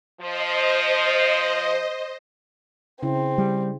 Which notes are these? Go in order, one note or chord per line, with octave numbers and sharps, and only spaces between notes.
F3 C5 D#5
C#3 C4 E4
G3